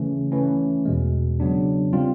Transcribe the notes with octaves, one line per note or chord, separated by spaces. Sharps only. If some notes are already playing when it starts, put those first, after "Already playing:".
Already playing: C#3 E3 A3 C#4
E3 A3 C#4
E2 B2 G#3
C#3 F#3 B3 D4
G3 C4 F4